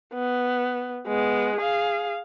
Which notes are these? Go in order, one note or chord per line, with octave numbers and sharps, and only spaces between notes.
B3
G#3 B3
G#4 F5